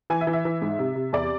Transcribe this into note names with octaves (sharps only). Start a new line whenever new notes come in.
E3 G#5
E5
E3
E5
E3
G#2
C3
C3
E2 D5